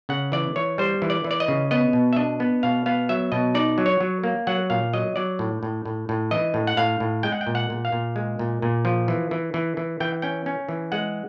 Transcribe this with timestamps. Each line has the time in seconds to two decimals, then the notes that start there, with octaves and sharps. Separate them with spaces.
0.09 C#3 F#5
0.32 E3 D5
0.56 E3 C#5
0.78 G3 C5
1.02 E3
1.10 D5
1.24 E3
1.31 D5
1.40 D#5
1.48 C#3
1.71 B3 D#5
1.93 B2
2.13 E5
2.16 D4 D#5
2.40 B3
2.63 B2 F5
2.86 B3 F5
3.09 F#3 E5
3.32 B2 D#5
3.55 D#4 D5
3.78 F#3
3.86 C#5
4.01 F#3
4.24 A#3
4.47 F#3 F#5
4.70 A#2 F5
4.93 F#3 D#5
5.16 F#3 D5
5.39 A2
5.63 A2
5.85 A2
6.09 A2
6.31 E3 D#5
6.54 A2
6.67 F#5
6.77 A2 F5
7.00 A2
7.23 G#3 G5
7.32 F#5
7.41 G5
7.47 A#2
7.55 F#5
7.70 A#2
7.85 F5
7.92 A#2
8.16 G#3
8.39 A#2
8.62 A#2
8.85 F3
9.08 E3
9.31 E3
9.54 E3
9.77 E3
10.00 E3 G5
10.22 C#4 G5
10.46 C#4
10.69 E3
10.92 G#3 F#5